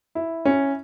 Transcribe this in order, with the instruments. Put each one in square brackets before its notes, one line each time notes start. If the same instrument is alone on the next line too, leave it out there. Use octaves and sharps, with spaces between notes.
[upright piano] E4
C#4